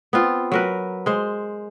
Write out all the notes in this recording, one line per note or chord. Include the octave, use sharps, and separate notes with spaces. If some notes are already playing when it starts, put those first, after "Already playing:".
B3 C4 F4
F#3 A#4 B4
G#3 C5